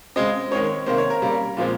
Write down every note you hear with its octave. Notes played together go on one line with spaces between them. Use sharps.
C#3 G#3 C4 D#5
D#3 G#3 C4 C#5
C3 D#3 A#3 C5
C#5
A#4
C#3 G3 A#3
A#2 F3 G#3 C4